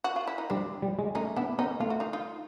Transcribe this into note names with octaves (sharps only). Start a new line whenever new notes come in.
F#4
F4
E4
D#4
G3 C4 D4
G3
G#3
A3 C#4 D#4
B3 D4 E4
B3 C#4 D#4
A3 F4
F#4
D#4 F4
D#4 F4